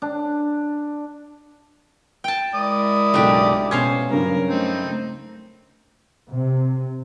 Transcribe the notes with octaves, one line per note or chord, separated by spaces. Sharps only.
D4
G5 A5
G#3 E4 A#4 D5 D#6
F#1 B1 A3 D4 G4
B2 C#4 C5 F5 G#5 G#6
G2 C#3 F#3 A#4
A3 C4 D#4
C3